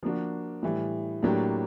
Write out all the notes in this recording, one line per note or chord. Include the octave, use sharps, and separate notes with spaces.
F3 A#3 D4 F#4
A2 E3 G3
A2 F#3 A#3 D4 G4